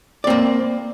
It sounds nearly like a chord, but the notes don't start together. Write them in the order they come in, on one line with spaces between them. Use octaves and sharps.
D5 C4 A#3